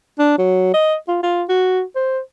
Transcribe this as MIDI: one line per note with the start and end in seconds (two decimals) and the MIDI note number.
0.19 0.37 62
0.38 0.71 54
0.74 0.95 75
1.08 1.18 65
1.23 1.43 65
1.49 1.83 66
1.95 2.19 72